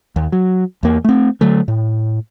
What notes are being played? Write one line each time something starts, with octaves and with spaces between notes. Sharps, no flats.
D#2
F#3
E2 A#3
A3 C4
D3 F#3 A3
A2